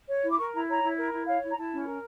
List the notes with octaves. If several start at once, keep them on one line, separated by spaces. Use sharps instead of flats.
C#5
E4 D6
A#4 C#6
E4 A#5
C#5 A#5
E4
A#4
E4
C#5 F5
E4
A#5
E4 A5
C#4
A#4